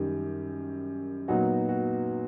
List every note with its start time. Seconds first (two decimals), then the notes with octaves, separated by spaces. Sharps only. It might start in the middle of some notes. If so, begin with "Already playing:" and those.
Already playing: F#2 D#3 G3 G4
1.28 A#2 F#3 B3 D#4 F#4
1.69 F#4